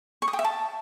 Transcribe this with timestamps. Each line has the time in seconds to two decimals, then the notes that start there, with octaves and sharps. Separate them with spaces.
0.22 C#6
0.28 D#6
0.33 G5
0.39 E5
0.44 A5